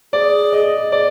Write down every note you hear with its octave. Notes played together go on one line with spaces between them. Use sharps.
G#4 D5
D#5
D5